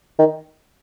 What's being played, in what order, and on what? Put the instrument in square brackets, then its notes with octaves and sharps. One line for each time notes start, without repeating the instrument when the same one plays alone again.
[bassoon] D#3